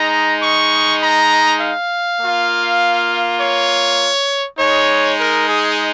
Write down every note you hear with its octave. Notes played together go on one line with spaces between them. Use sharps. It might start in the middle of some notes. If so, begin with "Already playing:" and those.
Already playing: G#3 D#4 A#5
C#6
A#5
F5
A#3 F4
C#5
G#3 D#4 C#5
A#4
G#4